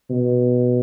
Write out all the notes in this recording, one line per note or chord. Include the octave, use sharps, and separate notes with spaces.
B2